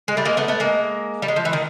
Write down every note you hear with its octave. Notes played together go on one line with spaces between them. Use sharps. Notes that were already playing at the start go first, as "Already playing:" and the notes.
G#3
G3 A3
G#3 A#3
A3 B3
A3 B3
G#3 A#3
G3
G#3
F3
E3
D#3